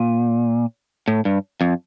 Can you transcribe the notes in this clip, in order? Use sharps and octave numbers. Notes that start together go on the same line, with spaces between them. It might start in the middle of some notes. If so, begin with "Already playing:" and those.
Already playing: A#2
A2
G2
F2